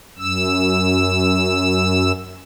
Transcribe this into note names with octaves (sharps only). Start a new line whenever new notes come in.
F#2 E6